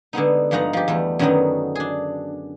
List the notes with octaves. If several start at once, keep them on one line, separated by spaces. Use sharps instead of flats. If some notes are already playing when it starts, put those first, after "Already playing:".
D3 G#3 B3 D#4
G2 F3 G#3 D#4 F#5 A#5
F3 G4
E2 G3 A3
F#2 D3 D#3 F#3 B3 D#4
D4 G#4